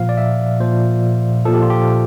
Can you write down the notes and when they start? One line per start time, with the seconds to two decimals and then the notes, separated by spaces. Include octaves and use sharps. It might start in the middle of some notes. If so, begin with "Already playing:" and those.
Already playing: A#2 F3 F5
0.09 D5
0.17 E5
0.60 A#2 F3 C5
1.45 A#2 F3 A4
1.54 G4
1.62 F4
1.70 G4